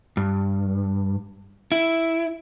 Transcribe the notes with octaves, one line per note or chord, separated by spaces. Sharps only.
G2
E4